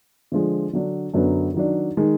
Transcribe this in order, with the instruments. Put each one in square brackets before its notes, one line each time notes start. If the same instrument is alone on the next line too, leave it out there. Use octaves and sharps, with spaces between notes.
[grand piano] D3 F3 G#3
D3 F#3 D4
F#2 D3 F#3 B3
D#3 F#3 D4
D#3 G#3